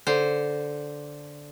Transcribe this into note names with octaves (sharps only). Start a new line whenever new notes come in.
D3 C5